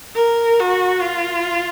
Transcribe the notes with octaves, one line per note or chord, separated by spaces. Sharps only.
A#4
F#4
F4